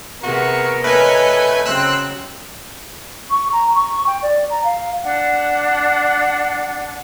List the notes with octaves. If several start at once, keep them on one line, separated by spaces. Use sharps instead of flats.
C3 B3 F#4 G#4 A#4
A3 B4 C#5 D#5 G#5
C#3 F#3 C4 E6 F#6
C#6
A#5
C#6
G5
D5
A#5
F5
D4 F#5